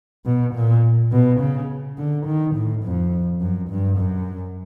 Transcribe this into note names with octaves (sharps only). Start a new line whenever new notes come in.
B2
A#2
B2
C#3
D3
D#3
A2
F2
F#2
G2
F#2